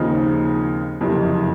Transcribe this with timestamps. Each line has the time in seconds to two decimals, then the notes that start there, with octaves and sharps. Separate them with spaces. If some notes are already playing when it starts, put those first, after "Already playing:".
Already playing: D#2 C#3 F3 C4 D#4
1.01 F#1 F2 C3